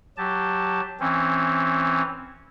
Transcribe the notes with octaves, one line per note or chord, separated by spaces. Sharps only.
F#3 G4 A5
E3 C4 C#4